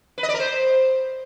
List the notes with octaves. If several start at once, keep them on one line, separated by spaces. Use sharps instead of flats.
B4
D#5
D5
A#4
C5